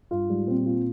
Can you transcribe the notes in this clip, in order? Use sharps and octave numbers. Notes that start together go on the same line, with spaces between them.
G2 F4
G#2 G3
A#2 C4
A#2 F4